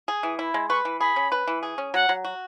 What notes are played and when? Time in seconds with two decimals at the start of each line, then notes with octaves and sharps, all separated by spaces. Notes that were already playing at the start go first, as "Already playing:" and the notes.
0.08 G#4
0.23 E3
0.39 E4
0.54 G#3
0.69 B4 C#6
0.85 E3
1.00 G#4 B5
1.16 C#4
1.32 B4
1.47 E3
1.63 G#4
1.78 C#4
1.94 F#3 F#5
2.09 F#3
2.24 F#4